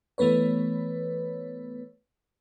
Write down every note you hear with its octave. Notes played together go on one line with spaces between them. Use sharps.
E3 A3 B3 B4 C#5